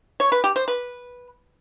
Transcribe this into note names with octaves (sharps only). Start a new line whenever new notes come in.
C#5
B4
G4
C5
B4